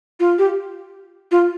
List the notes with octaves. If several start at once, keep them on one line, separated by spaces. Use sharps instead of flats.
F4
G4
F4